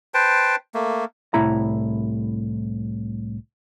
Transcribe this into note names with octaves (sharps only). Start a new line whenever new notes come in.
B4 C5 G5 A5
A3 A#3
C2 A2 E4 A#5